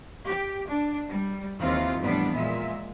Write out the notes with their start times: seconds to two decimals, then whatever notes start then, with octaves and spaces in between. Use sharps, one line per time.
0.27 G4
0.69 D4
1.10 G3
1.60 D#2 E3 C4 D#4 F4 F5
2.00 F2 A2 E3 G3 B3 D4
2.33 A#2 G#3 E5